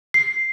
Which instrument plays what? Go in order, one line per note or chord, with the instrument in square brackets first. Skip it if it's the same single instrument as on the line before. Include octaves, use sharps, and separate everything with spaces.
[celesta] C7